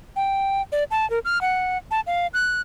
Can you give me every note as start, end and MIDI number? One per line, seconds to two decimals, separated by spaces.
0.16 0.62 79
0.72 0.84 74
0.91 1.08 81
1.10 1.19 70
1.25 1.41 89
1.41 1.78 78
1.91 2.01 81
2.07 2.27 77
2.34 2.61 90